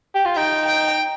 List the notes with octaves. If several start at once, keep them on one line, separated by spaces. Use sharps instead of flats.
G4
F4
D#4 G5
G5